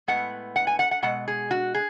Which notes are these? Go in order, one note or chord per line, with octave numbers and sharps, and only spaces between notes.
A2 G#3 B3 F#5
F#5
G#5
F#5
F#5
B2 G#3 F#5
G#4
F#4
G#4